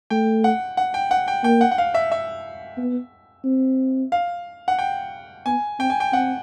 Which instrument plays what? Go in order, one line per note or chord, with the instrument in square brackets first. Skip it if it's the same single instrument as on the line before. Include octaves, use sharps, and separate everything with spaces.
[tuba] A3 [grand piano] G5
[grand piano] F#5
F#5
G5
F#5
G5
[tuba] A#3 [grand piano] G5
[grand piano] F#5
F#5
F5
E5
E5
[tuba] B3
C4
[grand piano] F5
F#5
G5
[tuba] B3 [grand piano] G#5
[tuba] C4 [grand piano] G5
[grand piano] G#5
G5
[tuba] C4 [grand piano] F#5